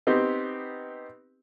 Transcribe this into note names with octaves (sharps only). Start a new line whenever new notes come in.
B3 C4 D#4 G4